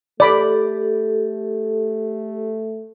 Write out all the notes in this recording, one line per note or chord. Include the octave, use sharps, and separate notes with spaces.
A3 G4 A4 D5 B5 D6